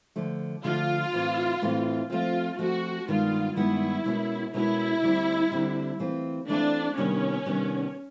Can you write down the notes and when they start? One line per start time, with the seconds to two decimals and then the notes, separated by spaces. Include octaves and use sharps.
0.16 D3 F3 A3
0.64 D3 F3 A3 F4
1.13 A2 E3 A3 C4
1.62 A2 E3 A3 C4
2.10 F3 A3 C4 F4
2.59 F3 A3 C4 F#4
3.08 G2 D#3 G#3 B3 F4
3.56 G2 D#3 G#3 B3 E4
4.05 B2 G#3 C#4 F#4 A#4
4.54 B2 G#3 C#4 E4 F#4 A#4
5.02 D2 D3 G3 C4
5.51 D2 D3 G3 C4
5.99 E3 A3 C4 F4
6.48 E3 A3 C4 D4 F4
6.97 C3 D#3 G3 B3 C#4 D4
7.45 C3 D#3 G3 B3 D4